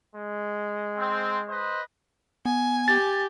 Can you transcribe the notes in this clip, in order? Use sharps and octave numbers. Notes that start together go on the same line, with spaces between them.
G#3
C4
B4 C5 D#5
B3 G#5
G4 A6